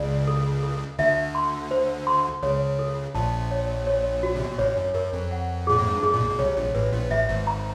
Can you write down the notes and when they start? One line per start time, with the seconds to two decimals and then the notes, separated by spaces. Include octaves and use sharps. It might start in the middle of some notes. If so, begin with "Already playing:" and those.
Already playing: C#2 C#3 D5
0.27 A4
0.63 A4
0.99 D2 D3 E5
1.35 C6
1.71 C5
2.07 C6
2.43 C#2 C#3 C#5
2.79 A4
3.15 A#1 A#2 A5
3.51 C#5
3.87 C#5
4.23 F#4
4.36 C3
4.44 B2
4.51 A#2
4.58 A1 A2 C#5
4.77 F#2
4.94 F#2 A#4
5.13 F2
5.31 F#5
5.67 A#2 G#4
5.79 A2
5.87 G#2
5.95 G2
6.03 F#2 G#4
6.13 A#2
6.21 B1 B2
6.31 B2
6.39 C2 C3 C#5
6.57 A#1 A#2
6.75 A1 A2 B4
6.93 A#1 A#2
7.10 A1 A2 E5
7.29 G#1 G#2
7.47 A#5